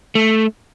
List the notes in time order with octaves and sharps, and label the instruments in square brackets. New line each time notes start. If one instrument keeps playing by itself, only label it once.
[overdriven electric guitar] A3